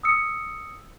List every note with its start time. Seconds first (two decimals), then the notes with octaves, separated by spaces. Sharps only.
0.03 D#6 E6 C#7